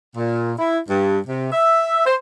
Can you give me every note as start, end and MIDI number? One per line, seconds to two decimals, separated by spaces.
0.16 0.52 46
0.58 0.78 64
0.88 1.18 43
1.26 1.47 48
1.52 2.01 76
2.06 2.15 72